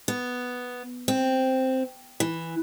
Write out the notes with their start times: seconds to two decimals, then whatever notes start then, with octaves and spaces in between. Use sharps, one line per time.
0.08 B3
1.08 C4
2.20 E3